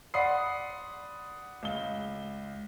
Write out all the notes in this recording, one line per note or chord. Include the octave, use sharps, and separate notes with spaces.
D5 F#5 B5 C6 D#6 C7
C#2 G7